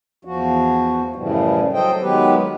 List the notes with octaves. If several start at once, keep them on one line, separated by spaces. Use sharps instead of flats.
E2 F3 F#4
F#2 A2 C#3 E3 F3 G3
F#3 A4 C5 D#5 G5
D#3 F#3 G#3 B3 G4 B4